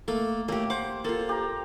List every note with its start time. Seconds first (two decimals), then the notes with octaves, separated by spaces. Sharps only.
0.08 A3 A#3 A4
0.48 A2 A3 A#3 G4
0.70 C5 F#5 D6
1.05 A#3 F4 A4
1.29 G4 A#5